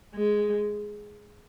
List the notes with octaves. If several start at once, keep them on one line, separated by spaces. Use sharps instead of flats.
G#3